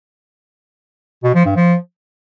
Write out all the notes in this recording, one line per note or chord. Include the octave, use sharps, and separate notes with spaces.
B2
F3
G2
F3